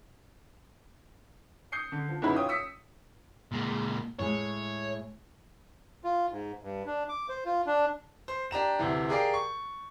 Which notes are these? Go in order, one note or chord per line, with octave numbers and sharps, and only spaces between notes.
D#6 G6 C7 C#7
D3
F3
F#1 B2 D#4 E4 F#4 B5
F4 C#5 G5 D#6
D#6 E6 B6 C#7
A#2 G#3
A2 G#3 C#5
F4
G#2
G2
D4
D6
C5
F4
D4
C5
D4 G4 A#5 E7
D2 C3 E3
G4 G#4 A#4 D5 F5 G5
C#6